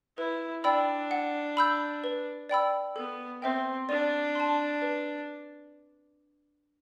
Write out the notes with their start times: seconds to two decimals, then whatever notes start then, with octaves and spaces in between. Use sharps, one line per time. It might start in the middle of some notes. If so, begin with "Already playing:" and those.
0.18 E4 B4
0.64 D4 D5 G5 B5 E6
1.11 F#5
1.57 B5 E6 G6
2.04 B4
2.49 D5 G5 B5 E6
2.96 B3 A4
3.42 C4 C5 E5 G5
3.89 D4 D5
4.35 A5 C6
4.82 B4